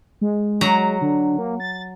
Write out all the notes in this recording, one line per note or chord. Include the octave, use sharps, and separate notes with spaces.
G#3
F#3 A#5
D3
A#3
A6